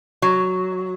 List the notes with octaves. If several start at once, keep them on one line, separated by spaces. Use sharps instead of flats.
F#3